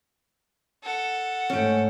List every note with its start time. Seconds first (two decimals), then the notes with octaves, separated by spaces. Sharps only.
0.83 A4 F#5
1.50 G#2 A3 C#4 G5